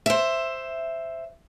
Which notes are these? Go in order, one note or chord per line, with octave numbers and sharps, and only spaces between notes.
C5 E5